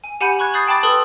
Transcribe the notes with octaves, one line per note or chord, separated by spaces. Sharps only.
G#5
G4 F#5 G#5 B5 G6 C#7
B5 C#6 F#6 G#6
B5 D#6 G6 A6 C7
G5 A5 B5 D6 A6
A4 B4 B5 C6 D#6